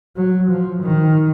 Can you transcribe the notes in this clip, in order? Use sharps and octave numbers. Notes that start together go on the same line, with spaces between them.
F#3
F3
D#3